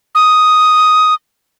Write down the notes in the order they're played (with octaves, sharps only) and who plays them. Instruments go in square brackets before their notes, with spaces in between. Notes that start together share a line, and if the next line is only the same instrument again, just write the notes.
[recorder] D#6